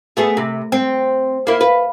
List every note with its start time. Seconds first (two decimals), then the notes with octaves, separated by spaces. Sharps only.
0.17 A3 B3 G#4
0.37 C3
0.72 C4
1.47 A#3 E4
1.61 B4